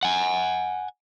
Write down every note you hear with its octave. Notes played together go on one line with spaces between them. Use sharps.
F#5 G#5